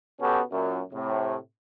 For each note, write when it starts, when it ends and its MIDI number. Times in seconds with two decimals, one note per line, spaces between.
0.20 0.40 47
0.20 0.40 59
0.20 0.40 61
0.20 0.40 66
0.20 0.40 67
0.20 0.40 69
0.51 0.79 42
0.51 0.79 46
0.93 1.36 45
0.93 1.36 48